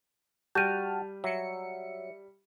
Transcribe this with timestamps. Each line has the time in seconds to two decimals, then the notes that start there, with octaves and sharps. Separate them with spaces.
0.55 G3 F#4 G5 A5 F6 G6 D#7
1.24 F#3 E5 C#7